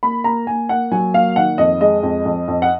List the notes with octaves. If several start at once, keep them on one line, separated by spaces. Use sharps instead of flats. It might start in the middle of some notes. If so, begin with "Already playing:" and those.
A#3 B5
A#3 A#5
A#3 G#5
A#3 F#5
F#3 G#5
A#3 F5
D#3 F#5
F2 D#5
G#3 D#5
F2
F2
F2
F#5